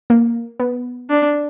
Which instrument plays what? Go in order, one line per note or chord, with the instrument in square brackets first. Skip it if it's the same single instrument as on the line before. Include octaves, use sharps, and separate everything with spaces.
[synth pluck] A#3
B3
[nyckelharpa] D4